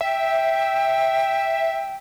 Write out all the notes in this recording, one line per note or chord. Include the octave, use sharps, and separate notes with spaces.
E5 G5